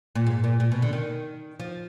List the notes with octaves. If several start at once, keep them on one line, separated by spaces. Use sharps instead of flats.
A#2
G#2
A#2
A#2
B2
D3
D#3
F3